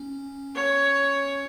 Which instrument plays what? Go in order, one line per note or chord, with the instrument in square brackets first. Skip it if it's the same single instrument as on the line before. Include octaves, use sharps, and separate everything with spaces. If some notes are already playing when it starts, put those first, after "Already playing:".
Already playing: [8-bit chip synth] C#4
[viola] C#5